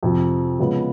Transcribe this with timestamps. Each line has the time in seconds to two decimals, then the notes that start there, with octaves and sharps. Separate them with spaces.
0.03 F2 C3 F3
0.60 C#3 F3 G#3 B3